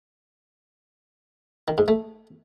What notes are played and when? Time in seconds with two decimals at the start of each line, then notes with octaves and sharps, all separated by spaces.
1.68 D#3
1.78 G#2
1.88 A3